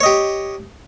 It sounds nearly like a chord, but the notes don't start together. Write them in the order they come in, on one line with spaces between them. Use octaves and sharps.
C#5 D#5 G4